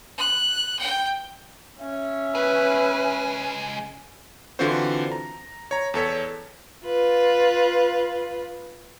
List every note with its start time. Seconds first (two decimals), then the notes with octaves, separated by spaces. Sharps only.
0.18 F#6
0.79 G5
1.80 C#4 E5
2.35 C#2 G#4 B4
4.59 D3 E3 C4 F4 F#4 C5
5.12 A#5
5.71 C#5 A#5
5.94 E2 A4 C#5 B6
6.85 F4 B4